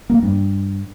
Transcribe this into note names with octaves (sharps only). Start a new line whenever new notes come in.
A#3
G2